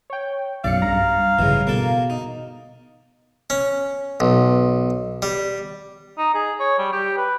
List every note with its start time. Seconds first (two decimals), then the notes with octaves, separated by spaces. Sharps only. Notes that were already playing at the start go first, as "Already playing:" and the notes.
0.10 C#5 G5
0.64 B1 F#2 D5 F5 C#7
0.82 G2 A#5
1.39 A1 G2 C#3 E3
1.67 B2 A#3 A4
2.10 D#4
3.50 C#4
4.20 B1
5.22 G3
6.18 D#4
6.34 G#4
6.60 C#5
6.78 G3
6.93 G4
7.17 B4